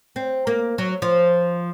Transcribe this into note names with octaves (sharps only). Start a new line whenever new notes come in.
C4
A#3
F#3
F3